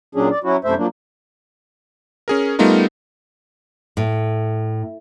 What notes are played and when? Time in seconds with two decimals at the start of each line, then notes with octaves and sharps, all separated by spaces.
0.15 A#2 F#3 C#4 D4 G#4
0.31 D5
0.44 F#3 C#4 E4 F#4
0.64 F#2 C3 A3 E4 C5 E5
0.77 F3 F#3 A#3 D4
2.28 C#4 G#4 A#4
2.59 G3 A3 B3 D#4 F4 A#4
3.97 A2